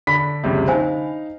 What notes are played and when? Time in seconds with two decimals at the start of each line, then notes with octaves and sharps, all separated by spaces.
0.07 D3 B5 B6
0.44 F#1 C#2 C3
0.68 D#4 C5 F5 G#5